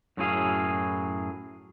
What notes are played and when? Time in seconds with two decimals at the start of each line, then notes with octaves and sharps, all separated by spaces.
0.17 F#2 A2 F#3 E4 G#4 F5